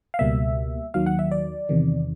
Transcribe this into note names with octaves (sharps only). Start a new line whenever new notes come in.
F5
C#2 B2 G3 A#3 E5
D#2 D#3 F#3 F5
F#5
E5
D5
E2 C3 D#3